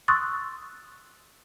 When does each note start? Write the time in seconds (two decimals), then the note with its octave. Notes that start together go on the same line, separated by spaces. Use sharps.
0.08 C6 C#6 D#6 E6 F#6 A6